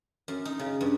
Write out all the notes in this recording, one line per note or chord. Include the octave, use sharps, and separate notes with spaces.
F#2
D#4
C#3
G2